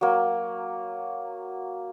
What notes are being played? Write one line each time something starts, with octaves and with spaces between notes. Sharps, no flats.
F#3 A#3